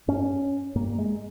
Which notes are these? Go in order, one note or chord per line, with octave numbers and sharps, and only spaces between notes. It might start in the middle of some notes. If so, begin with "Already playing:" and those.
G2 C#4
G2 A#3
G#3